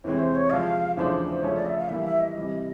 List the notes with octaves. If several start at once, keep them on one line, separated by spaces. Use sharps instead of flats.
E2 C3 E3 G#3 C4 C#5
C5
C#5
C3 F3 G#3 F5
E2 C#3 F3 A3 D4 C5
C5
C#3 F3 A3 C#4 C#5
D5
E5
F5
A2 E3 G3 A#3 E5
E5
D#5
C3 E3 G3